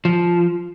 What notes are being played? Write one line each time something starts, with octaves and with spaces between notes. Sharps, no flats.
F3